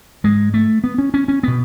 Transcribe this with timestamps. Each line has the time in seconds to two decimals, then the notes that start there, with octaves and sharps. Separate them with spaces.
0.24 G#2 G#3
0.54 A3
0.84 B3
0.98 C#4
1.14 C#4
1.28 C#4
1.43 B2 B3